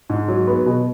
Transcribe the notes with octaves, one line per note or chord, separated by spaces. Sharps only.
G#2
F#3
B3
B2